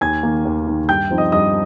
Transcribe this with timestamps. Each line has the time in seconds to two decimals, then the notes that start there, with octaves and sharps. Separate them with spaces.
0.01 D#2 G#5 G#6
0.23 D#3 A#3
0.45 D#2
0.67 D#3 A#3
0.89 G2 G5 G6
1.10 F3 C4 D#4
1.18 D#5 D#6
1.32 G2 D#5 D#6